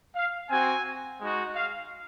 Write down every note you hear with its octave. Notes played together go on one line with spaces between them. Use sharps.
F5
C4 F#4 G#5
G#3 D#4 F#4
F5